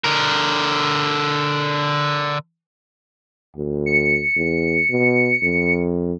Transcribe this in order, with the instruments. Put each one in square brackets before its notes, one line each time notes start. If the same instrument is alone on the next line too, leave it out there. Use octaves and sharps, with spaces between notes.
[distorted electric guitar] D3 A#4
[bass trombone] D2
[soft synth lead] C#7
[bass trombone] E2
B2
F2